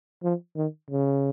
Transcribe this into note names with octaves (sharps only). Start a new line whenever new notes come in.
F3
D#3
C#3